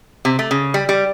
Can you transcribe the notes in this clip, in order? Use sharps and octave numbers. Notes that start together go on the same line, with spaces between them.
C3
A3
C#3
G3
G3